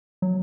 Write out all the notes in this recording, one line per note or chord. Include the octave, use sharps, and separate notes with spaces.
F#3